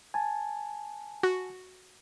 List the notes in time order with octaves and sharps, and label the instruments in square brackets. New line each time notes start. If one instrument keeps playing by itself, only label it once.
[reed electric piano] G#5 A5
[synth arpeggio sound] F#4